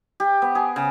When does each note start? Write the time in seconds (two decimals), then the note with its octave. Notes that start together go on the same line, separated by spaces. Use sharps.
0.20 G4
0.42 B3
0.55 G#4
0.76 C#3